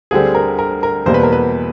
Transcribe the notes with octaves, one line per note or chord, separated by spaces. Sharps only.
D2 D3 G3 C4 G#4
A#4
A#4
A#4
E2 B2 G3 A#3 C5
B4
A#4
B4